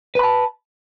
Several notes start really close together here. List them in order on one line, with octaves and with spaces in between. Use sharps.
B4 B5 A5